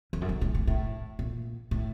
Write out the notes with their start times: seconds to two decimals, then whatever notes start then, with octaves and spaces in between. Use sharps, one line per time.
0.13 F2
0.21 F#2
0.29 G2
0.41 A2
0.55 A2
0.67 A2
1.19 A#2
1.71 A2